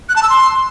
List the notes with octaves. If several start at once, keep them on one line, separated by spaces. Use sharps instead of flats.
F#6
A5
E6
C6